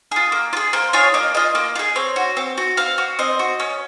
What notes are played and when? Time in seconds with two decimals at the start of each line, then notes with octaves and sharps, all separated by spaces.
0.11 F4 G#4
0.32 A#3
0.53 F4
0.57 G#4
0.73 A#3 C5
0.93 F4 G#4 C#5
1.14 A#3 D#5
1.34 F4 G#4 D#5
1.55 A#3
1.75 F4
1.79 G#4
1.96 C4 C#5
2.16 F#4
2.37 C4
2.58 F#4
2.77 C4 F5
2.98 F#4
3.19 C4 D#5
3.39 F#4
3.60 C#4